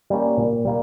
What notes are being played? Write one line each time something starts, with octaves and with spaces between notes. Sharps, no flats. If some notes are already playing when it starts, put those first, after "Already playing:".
G3 A#3 C#4
A#2
G3 A#3